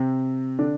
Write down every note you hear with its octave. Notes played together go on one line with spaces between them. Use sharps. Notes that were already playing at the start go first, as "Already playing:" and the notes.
Already playing: C3 C4
D3 D4